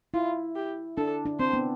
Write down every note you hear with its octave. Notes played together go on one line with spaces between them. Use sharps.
E4 F4
G4
D4 A4
D4
C4 C5
B3